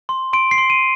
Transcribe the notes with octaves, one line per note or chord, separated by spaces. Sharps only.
C6
C6 D7
C7
C6
D#7